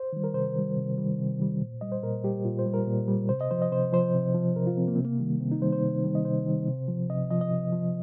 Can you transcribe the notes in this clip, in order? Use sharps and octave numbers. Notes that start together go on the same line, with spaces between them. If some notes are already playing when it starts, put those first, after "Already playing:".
Already playing: C5
D#3 G3
A#4
C3 C5
D#3 G3
C3
D#3 G3
C3
D#3 G3
A#2
G3 D#5
C5
A#2 A#4
G3 G4
A#2 F4
C5
G3
A#4
A#2
G3
C3 C5
D#5
F3 C5
D#5
C3 C5
F3 C5
C3
F3
C3 A#4
F4
F3 C4
A#3
C4
C3
A#3
D#3 G3
C3 C4
D#4
D#3 G3 C5
C5
C3
D#3 G3
D#5
C3 C5
D#3 G3
C3
F3
C3 D#5
F3 D#5
D#5
C3
F3